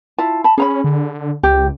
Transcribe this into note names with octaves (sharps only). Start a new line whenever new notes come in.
E4 F4 A5
A5 B5
C#4 G#4 A#5 B5
D3
C#2 G4